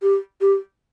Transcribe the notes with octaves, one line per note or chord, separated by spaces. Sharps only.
G4
G4